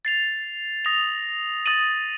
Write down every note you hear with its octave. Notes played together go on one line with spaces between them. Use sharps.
A6 C7 F7
D#6 A#6 F7
D#6 A6 D#7 F#7